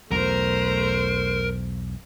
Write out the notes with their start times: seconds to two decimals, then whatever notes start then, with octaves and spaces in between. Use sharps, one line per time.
0.11 B1 E2 A3 A#4 C5